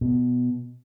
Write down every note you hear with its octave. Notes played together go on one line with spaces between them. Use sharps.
B2